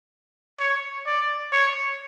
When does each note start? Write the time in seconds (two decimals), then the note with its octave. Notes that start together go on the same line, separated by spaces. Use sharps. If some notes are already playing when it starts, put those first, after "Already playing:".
0.60 C#5
1.06 D5
1.52 C#5